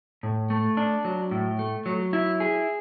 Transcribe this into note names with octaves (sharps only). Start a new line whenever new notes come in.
A2
A3
D4
F#3
A2
A3
F#3
E4
G#4